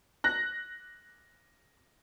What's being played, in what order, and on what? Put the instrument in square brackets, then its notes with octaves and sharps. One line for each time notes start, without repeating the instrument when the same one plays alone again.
[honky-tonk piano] F#6 A#6